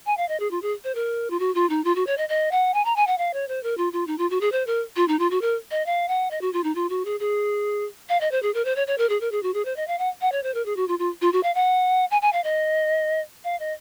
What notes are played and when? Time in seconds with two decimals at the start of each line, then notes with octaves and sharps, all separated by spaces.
0.06 G#5
0.17 F5
0.29 D#5
0.40 G#4
0.51 F4
0.62 G#4
0.84 C5
0.95 A#4
1.30 F4
1.39 F#4
1.55 F4
1.70 D#4
1.84 F4
1.96 F#4
2.07 C#5
2.18 D#5
2.29 D#5
2.52 F#5
2.74 G#5
2.85 A#5
2.96 G#5
3.07 F#5
3.18 F5
3.33 C#5
3.48 C5
3.63 A#4
3.78 F4
3.93 F4
4.07 D#4
4.18 F4
4.30 F#4
4.41 G#4
4.52 C5
4.67 A#4
4.96 F4
5.08 D#4
5.19 F4
5.31 F#4
5.41 A#4
5.71 D#5
5.86 F5
6.08 F#5
6.31 D#5
6.41 F#4
6.53 F4
6.64 D#4
6.75 F4
6.90 F#4
7.05 G#4
7.20 G#4
8.09 F5
8.21 D#5
8.31 C5
8.43 G#4
8.54 A#4
8.65 C5
8.76 C#5
8.87 C#5
8.98 A#4
9.09 G#4
9.21 A#4
9.32 G#4
9.43 F#4
9.54 G#4
9.65 C5
9.76 D#5
9.88 F5
9.99 F#5
10.21 F#5
10.32 C#5
10.43 C5
10.54 A#4
10.66 G#4
10.76 F#4
10.88 F4
10.99 F4
11.22 F4
11.33 F#4
11.43 F5
11.55 F#5
12.11 G#5
12.22 G#5
12.33 F5
12.44 D#5
13.44 F5
13.60 D#5